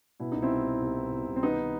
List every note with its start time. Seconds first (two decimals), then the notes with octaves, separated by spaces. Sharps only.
0.20 B2 E4
0.32 C2 D#4
0.42 C4 E4
0.51 C2
0.66 B2
0.81 C2
0.97 B2
1.12 B2
1.28 C2
1.36 C4
1.43 D#3 B3 D#4
1.58 D#3